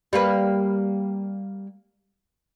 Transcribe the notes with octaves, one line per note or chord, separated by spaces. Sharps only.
G3 A#3 B4